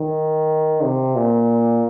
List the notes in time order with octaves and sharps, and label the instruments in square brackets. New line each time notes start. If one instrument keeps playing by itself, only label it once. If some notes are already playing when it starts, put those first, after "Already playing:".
Already playing: [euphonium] D#3
C3
A#2